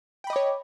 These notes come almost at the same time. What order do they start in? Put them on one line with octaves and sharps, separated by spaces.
G5 B5 D#5 D6 C#5